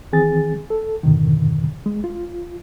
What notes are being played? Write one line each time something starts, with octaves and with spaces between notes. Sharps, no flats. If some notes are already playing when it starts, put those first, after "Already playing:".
D#3 E3 C4 G#4 G#5 A6
A4
F2 G#2 B2 D3 D#3
G#3
F4